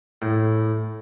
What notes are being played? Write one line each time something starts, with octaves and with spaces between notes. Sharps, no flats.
A2